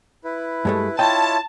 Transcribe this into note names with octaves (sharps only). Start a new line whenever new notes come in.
E4 B4
G2 G#3 A3
E4 F4 C#5 D#5 G5 A5